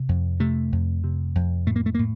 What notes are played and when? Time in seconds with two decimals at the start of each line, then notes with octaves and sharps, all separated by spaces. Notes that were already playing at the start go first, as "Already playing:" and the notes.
Already playing: C3
0.09 F2
0.40 C3 A3
0.72 F2
1.04 C3
1.35 F2
1.66 A2 A3
1.76 A#3
1.86 A3
1.95 A#3
1.99 A2